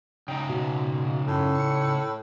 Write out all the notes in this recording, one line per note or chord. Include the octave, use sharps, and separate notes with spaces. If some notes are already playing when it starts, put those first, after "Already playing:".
C#3 D#4 G5
B2
F#2 A2
C#7